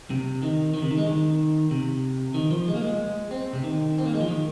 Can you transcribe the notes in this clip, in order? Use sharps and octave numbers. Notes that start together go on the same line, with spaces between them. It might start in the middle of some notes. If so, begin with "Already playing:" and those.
C3
D#3
D#3
C3
D#3
G#3
D#3
C3
D#3
F3
G#3
A#3
G#3
C4
C3
D#3
C4
A#3
G#3
F3
D#3